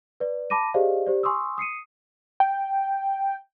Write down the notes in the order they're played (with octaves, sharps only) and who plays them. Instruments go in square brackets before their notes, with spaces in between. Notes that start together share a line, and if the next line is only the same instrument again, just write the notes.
[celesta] B4 D5
A5 B5 D6 A#6 D#7
G4 G#4 C5 D5 D#5 F5
G4 C5 D5
G#5 C6 C#6 D#6 E6
D#6 C7 C#7 D#7
[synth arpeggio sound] G5